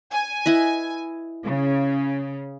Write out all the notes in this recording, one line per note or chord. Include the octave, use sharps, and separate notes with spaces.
G#5
E4 B4 D#5
C#3